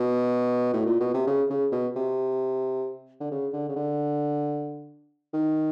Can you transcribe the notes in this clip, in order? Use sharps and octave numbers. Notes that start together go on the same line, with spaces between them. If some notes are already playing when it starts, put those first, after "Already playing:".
Already playing: B2
A2
A#2
B2
C3
C#3
C#3
B2
C3
D3
C#3
D3
C#3
D3
D#3